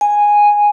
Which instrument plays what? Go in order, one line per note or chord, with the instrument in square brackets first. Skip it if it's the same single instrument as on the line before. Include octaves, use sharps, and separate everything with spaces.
[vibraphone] G#5